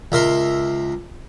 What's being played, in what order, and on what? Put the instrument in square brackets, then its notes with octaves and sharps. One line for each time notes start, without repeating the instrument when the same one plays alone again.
[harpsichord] C#2 A#4 E5 C6